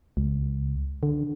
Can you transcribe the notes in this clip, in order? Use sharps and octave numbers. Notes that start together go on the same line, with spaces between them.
C#2
D3